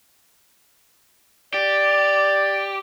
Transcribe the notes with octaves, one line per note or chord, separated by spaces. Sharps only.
G4 D5